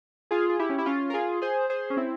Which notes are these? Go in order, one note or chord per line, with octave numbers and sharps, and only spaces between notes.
F4 G#4
G#4
E4 G4
C#4
E4
C#4 F4
A#4
F4 G#4
G#4 C5
G#4 C5
C#4
C4 E4